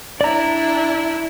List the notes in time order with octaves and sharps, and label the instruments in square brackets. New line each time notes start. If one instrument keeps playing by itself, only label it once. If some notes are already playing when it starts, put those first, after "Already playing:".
[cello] D4 E4 [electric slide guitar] D5 A#5